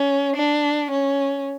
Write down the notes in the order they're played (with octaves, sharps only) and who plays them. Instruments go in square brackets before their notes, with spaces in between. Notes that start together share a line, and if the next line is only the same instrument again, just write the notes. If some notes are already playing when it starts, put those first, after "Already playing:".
Already playing: [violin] C#4
D4
C#4